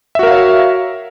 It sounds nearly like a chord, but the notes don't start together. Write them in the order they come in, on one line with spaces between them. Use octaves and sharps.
E5 F#4 A#4 F5 C#5